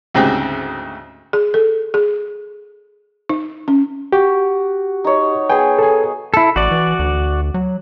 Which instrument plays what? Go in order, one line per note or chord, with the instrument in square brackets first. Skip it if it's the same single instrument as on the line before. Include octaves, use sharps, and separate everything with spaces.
[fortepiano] D2 G#2 C#3 C4 F#4 G4
[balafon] G#4
A4
G#4
D#4
C#4
[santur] F#4 [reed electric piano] G4
[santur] D#4 C#5
[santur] B3 G#4 [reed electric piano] G5 G#5
[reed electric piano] A4 G#5
[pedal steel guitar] E4 A4
[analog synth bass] A1 [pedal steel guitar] F#4 D5
[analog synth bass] E3
D2
F#3